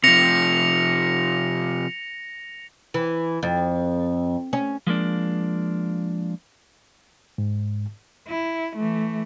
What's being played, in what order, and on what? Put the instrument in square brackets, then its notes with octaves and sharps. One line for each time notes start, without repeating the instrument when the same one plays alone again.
[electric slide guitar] C3 F3 [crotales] A#6 C#7 F7
[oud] E3
F2
C#4
[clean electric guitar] F3 G#3 A#3 D4
[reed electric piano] G#2
[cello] E4
E3 A3